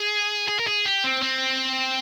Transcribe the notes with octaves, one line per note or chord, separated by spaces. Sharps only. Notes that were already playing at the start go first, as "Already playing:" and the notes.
Already playing: G#4
G#4
A#4
G#4
G4
C4
C4